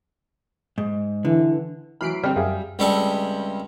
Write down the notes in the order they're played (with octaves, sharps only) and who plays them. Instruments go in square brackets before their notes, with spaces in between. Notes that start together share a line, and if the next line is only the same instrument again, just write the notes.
[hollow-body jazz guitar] G#2
[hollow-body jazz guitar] D3 [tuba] E3
[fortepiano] E3 F#3 F6 [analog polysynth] B5 C7 D7
[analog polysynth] D3 C4 [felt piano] G3 [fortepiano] F6
[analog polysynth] F#2 [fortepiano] G#4 E5 F5
[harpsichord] C#2 G3 C4 C#4 A4 E5